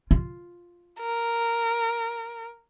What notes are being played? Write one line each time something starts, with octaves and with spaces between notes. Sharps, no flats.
F4
A#4